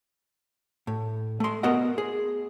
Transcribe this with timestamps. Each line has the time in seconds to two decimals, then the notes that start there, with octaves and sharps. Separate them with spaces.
0.87 A2
1.40 A3 C6
1.63 B3 F#4 A#4 D#5 F#5
1.98 G#4